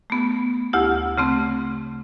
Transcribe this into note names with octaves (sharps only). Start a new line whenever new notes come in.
A3 B3
D2 E4 G4
C#3 A3 C4